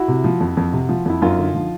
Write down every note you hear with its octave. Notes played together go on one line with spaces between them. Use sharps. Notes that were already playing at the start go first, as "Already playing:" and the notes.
Already playing: E4 F#4
C3
F3
F2
F2
C3
F3
F2 E4
F#2 D#4 F4
D3
F3